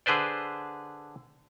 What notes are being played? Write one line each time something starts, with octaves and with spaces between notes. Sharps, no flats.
D3 G#4 B4 C5 D5